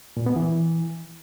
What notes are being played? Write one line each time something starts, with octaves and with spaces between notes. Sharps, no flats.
A#2
B3
E3